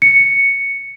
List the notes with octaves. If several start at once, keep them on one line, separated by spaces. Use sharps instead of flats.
C#7